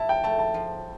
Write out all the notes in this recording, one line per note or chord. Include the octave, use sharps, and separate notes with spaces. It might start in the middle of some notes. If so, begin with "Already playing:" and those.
Already playing: E4 A5
G5
A3 A5
A5
F3